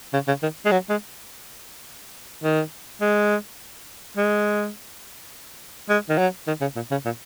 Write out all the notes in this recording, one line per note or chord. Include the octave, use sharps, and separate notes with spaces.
C#3
C#3
D#3
G#3
F#3
G#3
D#3
G#3
G#3
G#3
D#3
F#3
D#3
C#3
A#2
C#3
A#2